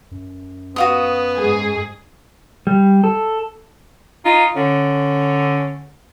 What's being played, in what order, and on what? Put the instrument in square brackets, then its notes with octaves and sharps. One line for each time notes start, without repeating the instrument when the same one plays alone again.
[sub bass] F#2
[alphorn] B3 [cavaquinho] F#4 F5 D#6
[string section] G#2 G#4
[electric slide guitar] G3
A4
[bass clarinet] D#4 [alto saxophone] F4
[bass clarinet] D3 [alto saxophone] C#4